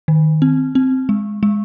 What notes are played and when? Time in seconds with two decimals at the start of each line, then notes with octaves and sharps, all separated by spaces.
0.08 D#3
0.42 C4
0.75 C4
1.09 G#3
1.43 G#3